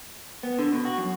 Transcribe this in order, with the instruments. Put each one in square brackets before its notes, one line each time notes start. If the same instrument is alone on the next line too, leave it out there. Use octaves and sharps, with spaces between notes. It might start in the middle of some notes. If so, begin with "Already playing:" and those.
[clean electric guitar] B3
D3
B2
F#4
F#2